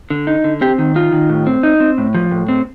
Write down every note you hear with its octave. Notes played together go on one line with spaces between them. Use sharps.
D3
D#4
D3
C4 G4
D#3
D#4 F4
D#3
A2
C4
D#4
C4
A2
F3
A2
C4